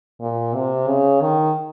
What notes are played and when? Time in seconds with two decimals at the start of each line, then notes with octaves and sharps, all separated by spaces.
0.21 A#2
0.54 C3
0.88 C#3
1.21 D#3